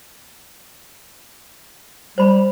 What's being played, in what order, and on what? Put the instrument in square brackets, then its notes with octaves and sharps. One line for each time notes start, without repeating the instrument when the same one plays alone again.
[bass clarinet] G3 [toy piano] C5 B5